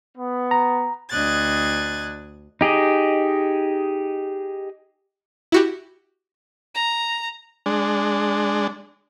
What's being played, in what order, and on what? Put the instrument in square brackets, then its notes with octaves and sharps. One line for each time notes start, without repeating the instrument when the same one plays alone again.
[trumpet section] B3
[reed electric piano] A#5
[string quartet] D2 D4 D#5 F#6 G#6 A6
[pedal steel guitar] D#4 G4 G#4 D#5
[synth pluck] E4 F#4 G4
[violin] A#5
[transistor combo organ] G#3 D4